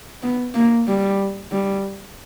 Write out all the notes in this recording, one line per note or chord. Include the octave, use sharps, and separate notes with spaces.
B3
A#3
G3
G3